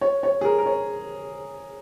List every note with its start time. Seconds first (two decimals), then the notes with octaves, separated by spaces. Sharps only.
0.01 C#5
0.23 C#5
0.41 G#4
0.45 A#4
0.58 A#4
0.66 C#5